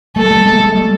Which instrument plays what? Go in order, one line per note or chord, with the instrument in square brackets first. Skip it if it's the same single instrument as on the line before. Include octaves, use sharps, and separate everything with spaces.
[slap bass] G3 A3 [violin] A4
[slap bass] G#3
G3 A3
G#3 A#3
G#3 A#3
G3 A3